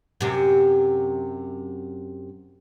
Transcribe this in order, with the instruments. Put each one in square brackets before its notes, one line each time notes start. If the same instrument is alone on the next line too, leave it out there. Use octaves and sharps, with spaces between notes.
[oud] F#2 C3